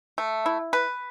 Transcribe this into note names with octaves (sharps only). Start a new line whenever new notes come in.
A3
E4
B4